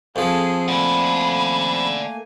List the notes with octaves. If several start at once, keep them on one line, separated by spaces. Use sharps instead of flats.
F2 F3 G#4 A4
A3 A#3 D5 F#5 G#5 B5